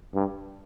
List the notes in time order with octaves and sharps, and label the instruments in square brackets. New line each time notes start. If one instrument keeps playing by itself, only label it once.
[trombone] G2